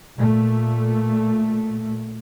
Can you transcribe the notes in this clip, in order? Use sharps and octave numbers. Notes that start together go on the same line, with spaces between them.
A#2 A3